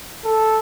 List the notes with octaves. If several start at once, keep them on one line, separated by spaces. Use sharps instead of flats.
A4